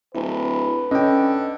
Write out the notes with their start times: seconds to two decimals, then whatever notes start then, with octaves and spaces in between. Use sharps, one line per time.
0.15 D1 E4 B4
0.91 D3 C#4 D#5 G5